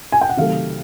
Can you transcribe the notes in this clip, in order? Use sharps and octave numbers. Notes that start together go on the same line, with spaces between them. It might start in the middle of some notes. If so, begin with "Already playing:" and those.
G#5
G5
F#5
C3 D#3 F#3 A3 F5